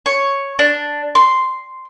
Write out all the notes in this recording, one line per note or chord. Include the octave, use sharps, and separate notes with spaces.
C#5
D4
C6